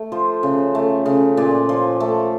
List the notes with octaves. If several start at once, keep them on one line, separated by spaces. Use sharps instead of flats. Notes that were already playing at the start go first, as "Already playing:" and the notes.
Already playing: A3
F3 C5
C#3
A3
C#3
A#2 D5
F3
A3